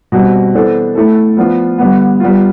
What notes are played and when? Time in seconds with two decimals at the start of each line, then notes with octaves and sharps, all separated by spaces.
0.12 B2 G3 C4
0.54 E3 B3 D4 A4 C5
0.95 A3 E4 A4
1.37 F3 B3 D4 F4
1.78 D3 G3 B3
2.20 G3 B3 F4